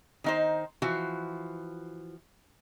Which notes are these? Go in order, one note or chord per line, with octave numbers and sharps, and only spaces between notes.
D#3 D#4 C5
E3 F3 F#4